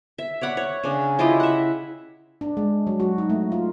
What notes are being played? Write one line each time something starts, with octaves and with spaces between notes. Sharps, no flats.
E5
C#5 D5 F#5 B5
C#5
C#3 C#4 D4
E4 F4 G4 D#5
E5 F#5
D4
G#3
F#3
F#4
D#4
A3
F4